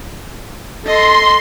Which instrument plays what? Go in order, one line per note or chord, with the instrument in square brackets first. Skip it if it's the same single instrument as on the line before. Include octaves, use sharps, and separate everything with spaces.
[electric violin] A4 D#5 [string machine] C6